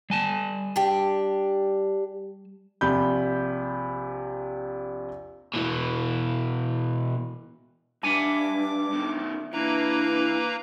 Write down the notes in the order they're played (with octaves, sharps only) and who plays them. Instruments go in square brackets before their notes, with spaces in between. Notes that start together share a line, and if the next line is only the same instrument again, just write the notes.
[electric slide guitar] G3 G#5 A5
[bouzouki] D4 G4
[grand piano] A#1 C3 B5 G6
[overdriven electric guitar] B2 E3
[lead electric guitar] G2 [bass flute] D4 [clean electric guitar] E5 F#5 G#5 [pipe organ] D6
[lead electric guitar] B2 D#3
[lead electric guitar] E3 [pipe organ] A#3 B4 A#5 [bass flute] D4